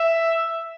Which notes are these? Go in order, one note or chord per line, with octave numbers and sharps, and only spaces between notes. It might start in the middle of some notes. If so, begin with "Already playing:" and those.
Already playing: E5